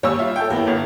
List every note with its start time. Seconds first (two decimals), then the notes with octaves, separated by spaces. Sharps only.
0.03 D#2 G3 C#5 E6
0.19 F4 E5
0.36 A4 G5
0.50 D#2 A#3 B3 E4 A#4
0.67 G1